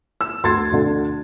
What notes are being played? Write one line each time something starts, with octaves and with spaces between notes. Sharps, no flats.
E6
D2 C6 G#6 A6
D2 D3